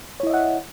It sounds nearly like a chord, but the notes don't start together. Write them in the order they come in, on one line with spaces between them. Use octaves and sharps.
C#5 E4 D#5 E5 F#5